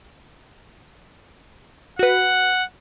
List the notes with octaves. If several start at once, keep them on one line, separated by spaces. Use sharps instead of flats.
F#4 B4 F#5